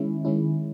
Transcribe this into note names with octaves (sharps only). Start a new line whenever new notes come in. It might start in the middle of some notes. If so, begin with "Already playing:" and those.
Already playing: D#3 G#3 C#4 E4
D#3 G#3 C#4 E4